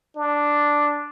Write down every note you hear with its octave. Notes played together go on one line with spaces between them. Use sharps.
D4